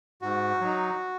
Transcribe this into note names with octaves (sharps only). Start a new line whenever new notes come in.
G#2 F#4
F#3 D#4